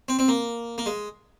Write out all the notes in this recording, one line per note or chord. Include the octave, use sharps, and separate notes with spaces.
C4
C4
A#3
A#3
G#3